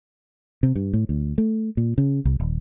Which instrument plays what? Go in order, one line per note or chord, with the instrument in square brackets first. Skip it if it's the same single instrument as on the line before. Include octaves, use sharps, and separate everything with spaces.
[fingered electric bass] C3
G2
A2
D2
A3
A#2
C#3
C2
D#1